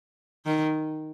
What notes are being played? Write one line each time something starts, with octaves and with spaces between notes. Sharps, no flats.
D#3